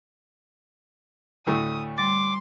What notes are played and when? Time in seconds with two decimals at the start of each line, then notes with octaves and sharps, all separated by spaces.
1.47 D2 A2 A3 D#6
1.98 G3 C6 D6 A6